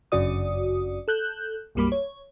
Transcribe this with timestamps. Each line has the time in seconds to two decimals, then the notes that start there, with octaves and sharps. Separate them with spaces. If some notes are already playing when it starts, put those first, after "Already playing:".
0.12 G1 F#2 C#3 F#4 D5 D#6
1.08 A4 F#6 G6
1.75 B1 F#2 G3 A#3 B5 D6
1.92 C#5